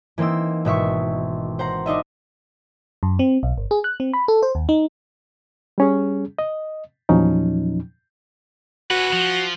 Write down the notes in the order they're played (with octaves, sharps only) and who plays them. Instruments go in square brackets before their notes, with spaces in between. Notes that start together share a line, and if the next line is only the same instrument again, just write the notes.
[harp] E3 A#3 C4 D#4 E6
G#1 B2 E5 C#6
C5 F#5 A#5
D4 D#4 D#5 E5
[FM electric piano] F#2
C4
B1
G1
G#4
F#6
C4
B5
A4
C5
D#2
D#4
[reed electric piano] G3 C#4 G#4
D#5
E2 A#2 F3 F#3 C#4 D#4
[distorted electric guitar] C#4 B4 [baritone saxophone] F#4
[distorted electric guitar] F3